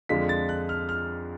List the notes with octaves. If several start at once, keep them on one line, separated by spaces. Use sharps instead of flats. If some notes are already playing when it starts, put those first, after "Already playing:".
F2 D3 G#3 D4 F4 B6
A6
F#6
F6
F6